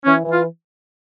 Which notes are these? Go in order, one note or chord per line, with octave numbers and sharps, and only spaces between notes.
E3 C#4
E3
F4